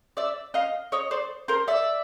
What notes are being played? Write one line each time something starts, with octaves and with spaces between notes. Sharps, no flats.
D5 E5
D#5 F5
C#5 D#5
C5 D5
A#4 C5
D5 E5